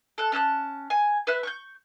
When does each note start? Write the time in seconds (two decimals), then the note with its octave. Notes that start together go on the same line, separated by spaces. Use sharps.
0.18 A4 F#6
0.32 C#4 A5 E6 F#6
0.90 G#5
1.27 B4 E5 F#6
1.43 C#6 F#6 G6